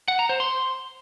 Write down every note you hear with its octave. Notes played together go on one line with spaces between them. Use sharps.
F#5
A#5
C5
C6